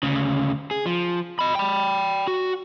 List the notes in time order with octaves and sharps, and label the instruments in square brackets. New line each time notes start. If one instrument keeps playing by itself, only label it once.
[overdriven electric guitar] D2 C#3
G#4
F3
D#5 B5
G5 B5
F#4